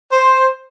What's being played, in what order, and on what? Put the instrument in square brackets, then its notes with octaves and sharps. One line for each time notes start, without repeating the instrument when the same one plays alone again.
[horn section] C5